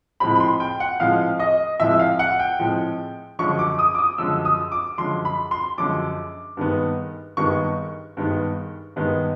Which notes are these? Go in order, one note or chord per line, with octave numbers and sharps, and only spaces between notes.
A2 F3 G#3 C4 B5
B5
C6
G5
F#5
A2 F3 G#3 C4 F5
D#5
A2 F3 G#3 C4 E5
F5
F#5
G5
A2 F3 G#3 C4
F#2 D3 F3 G#3 C#6
D6
D#6
D6
D#6
F#2 D3 F3 G#3 E6
D#6
D6
F#2 D3 F3 G#3 C6
B5
C6
F#2 D3 F3 G#3 D6
G2 D#3 G#3 B3
G2 D#3 G#3 B3 C#6
G2 D#3 G#3 B3
G2 D#3 G#3 B3